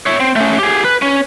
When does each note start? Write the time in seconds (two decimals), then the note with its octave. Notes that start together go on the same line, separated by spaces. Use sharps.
0.06 C#5 E5
0.20 C4
0.36 A3 C#4
0.59 G4 G#4
0.85 B4
1.02 C#4